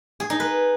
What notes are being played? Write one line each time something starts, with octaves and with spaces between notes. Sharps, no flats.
G#4
D#4
B4